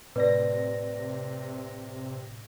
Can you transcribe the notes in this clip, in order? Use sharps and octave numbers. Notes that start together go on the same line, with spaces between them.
A2 C3 B4 D5 A#6